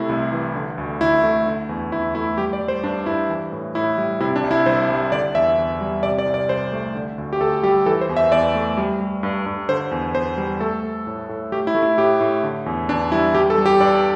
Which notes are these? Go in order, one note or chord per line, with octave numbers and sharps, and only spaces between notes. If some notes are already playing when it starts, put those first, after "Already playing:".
Already playing: C3 A3 E4
C2
E3
D3
D2
D2 E4
A3
D3
E2
E2 E4
A3 E4
G3 G4
D5
G3
C5
G2 D4
G2 E4
E3
A2
A2 E4
G3
C3 E4
D4
C2
E4
C2 C5
G3
D3 D5
E2 E5
E2
G3
C3 D5
D5
C2
D5
C2 C5
A3
D3
D2
G4
D2 A4
G3 G4
E3 A4
C5
E2
E5
E2 D5
A3
G3
G3
G2
G2
D3 C5
E2
E2 C5
G3
A3 A4
A3
A2
A2
A3 G4
E4
A3
E4
A2 G4
A2
D3
E2
E2 D4
G3 E4
G3 G4
A4
G3
G4
G2 D5